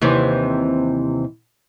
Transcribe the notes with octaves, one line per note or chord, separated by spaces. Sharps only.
D#2 C3 E3